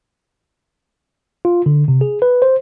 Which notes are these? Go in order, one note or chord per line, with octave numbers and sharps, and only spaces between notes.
F4
D3
C3
G#4
B4
C5